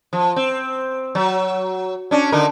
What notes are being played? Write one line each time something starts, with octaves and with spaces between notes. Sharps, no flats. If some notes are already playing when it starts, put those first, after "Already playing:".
F3
C4
F#3
C#4 D4
D3 D#4 A#4